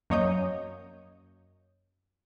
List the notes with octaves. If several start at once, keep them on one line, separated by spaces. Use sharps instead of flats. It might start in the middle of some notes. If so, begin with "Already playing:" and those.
F#2 A#3 C#5 D#5 D#6 G6